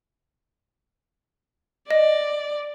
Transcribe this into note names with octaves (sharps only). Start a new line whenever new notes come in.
D5 D#5